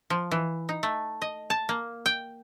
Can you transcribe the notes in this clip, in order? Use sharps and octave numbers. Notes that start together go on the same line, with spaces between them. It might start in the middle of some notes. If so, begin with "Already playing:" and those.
F3
E3
D#4
A3
D#5
A5
A#3
G5